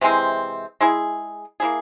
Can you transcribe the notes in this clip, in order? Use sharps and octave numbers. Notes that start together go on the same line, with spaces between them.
C3 E3 G#3 C4
G#3 E4 G#4
A#3 E4 G#4